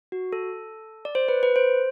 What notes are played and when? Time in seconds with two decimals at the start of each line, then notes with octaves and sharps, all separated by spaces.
0.12 F#4
0.33 A4
1.05 D5
1.15 C5
1.28 B4
1.43 B4
1.56 C5